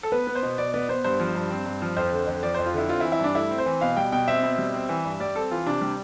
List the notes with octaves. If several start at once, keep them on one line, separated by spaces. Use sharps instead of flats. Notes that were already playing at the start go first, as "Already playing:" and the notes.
A4
B3 B4
B3
C5
B2
B2 D5
B3 D5
B3 C5
G2 C5
F3
G2
C4
G2
F3
F2 C5
D3
F2
F3 D5
F2 C5
F4
D3 E4
C4 F4
E4
E3
E4
G2 D4
A3 E4
C4
C5
E3
B2 F5
G3 G5
B2 G5
C4 E5
B2
G3
C4
E3
G2
G3 D5
C4 A4
E3 F4
C3 D4
G3